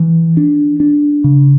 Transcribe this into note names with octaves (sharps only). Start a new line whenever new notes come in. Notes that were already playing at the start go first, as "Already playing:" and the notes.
Already playing: E3
D4
D4
C#3